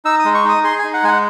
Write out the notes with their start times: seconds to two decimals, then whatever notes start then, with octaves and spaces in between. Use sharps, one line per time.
0.05 D#4 E6
0.19 D#6
0.25 G#3
0.35 C#6
0.44 D#4 D#6
0.64 G#4 C6
0.79 G#5
0.84 D#4
0.94 F#5
1.03 G#3 G#5
1.08 F#5